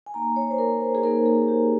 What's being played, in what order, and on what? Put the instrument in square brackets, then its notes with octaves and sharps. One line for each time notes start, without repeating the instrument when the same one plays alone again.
[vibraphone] G#5
A#3 D#4 A#5
C#5
C5
A#4
C5
G#4
A#3 D#4 A#4
G#4
G4